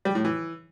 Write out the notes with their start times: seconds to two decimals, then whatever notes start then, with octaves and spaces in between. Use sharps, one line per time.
0.05 G3
0.15 A2
0.25 E3